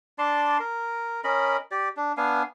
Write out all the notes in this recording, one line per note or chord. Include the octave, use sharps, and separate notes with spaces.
D4 D5 A5 C6
A#4
C#4 A#4 D#5 B5
G4 D5
D4
B3 D4 F5 G#5